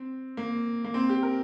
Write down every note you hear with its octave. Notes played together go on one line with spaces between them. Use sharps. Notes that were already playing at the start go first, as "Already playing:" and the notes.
Already playing: C4
A#3
A#3
C4
G4
A#4